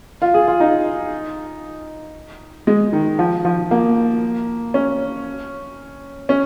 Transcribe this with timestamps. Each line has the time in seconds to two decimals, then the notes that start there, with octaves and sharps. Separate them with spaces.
0.22 F4
0.34 G#4
0.47 F4
0.60 D#4
2.67 G#3
2.93 D#3
3.19 F3
3.45 F3
3.71 A#3
4.74 C#4
6.29 C#4